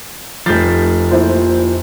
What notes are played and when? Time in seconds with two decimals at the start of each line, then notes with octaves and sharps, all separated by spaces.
0.46 F1 F3 A3 G6 A6
1.11 A#2 E4 C5